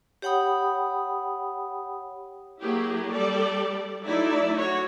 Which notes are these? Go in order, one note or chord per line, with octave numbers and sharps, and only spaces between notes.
G4 C#5 F#5 G5 B5 D#6
F#3 A#3 E4 G4 G#4
G3 G4 A4 D5
F#3 A3 D#4 E4 D5 E5
F#4 C#5